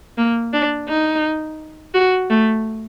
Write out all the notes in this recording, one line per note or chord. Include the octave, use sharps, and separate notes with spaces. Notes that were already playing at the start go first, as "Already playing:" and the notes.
A#3
D4
D#4
F#4
A3